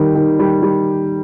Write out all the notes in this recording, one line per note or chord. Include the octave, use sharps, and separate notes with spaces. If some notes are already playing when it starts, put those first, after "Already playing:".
Already playing: D#3 G3
D#3
G3
G3